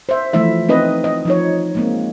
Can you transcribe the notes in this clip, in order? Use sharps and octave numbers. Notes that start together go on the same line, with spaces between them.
C5 E5
E3 F3 A3 E4 E5
C4 D#4 B4 D#5
D#5
F3 D#4 C#5
G#3 A#3 C4